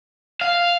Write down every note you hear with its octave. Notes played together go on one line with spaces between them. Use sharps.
F5